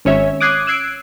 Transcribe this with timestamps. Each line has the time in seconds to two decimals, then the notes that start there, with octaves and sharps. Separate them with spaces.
0.05 G#1 C#4 C#5 E5
0.40 D6 D#6 F#6 G#6 C7
0.67 E6 F#6 G#6 C7 D7